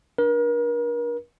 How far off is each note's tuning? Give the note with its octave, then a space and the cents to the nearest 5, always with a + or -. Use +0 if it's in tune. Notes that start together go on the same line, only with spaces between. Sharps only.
D4 +0 A#4 +40